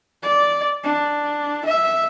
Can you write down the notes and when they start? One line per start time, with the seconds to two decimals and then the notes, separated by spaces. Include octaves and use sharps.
0.23 D5
0.83 D4
1.66 E5